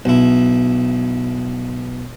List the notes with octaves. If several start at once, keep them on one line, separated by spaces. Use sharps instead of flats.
B1 E4